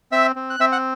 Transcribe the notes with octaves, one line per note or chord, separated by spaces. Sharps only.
C4 E5 E6
C4
F#6
C4 E5 E6
F#5 F#6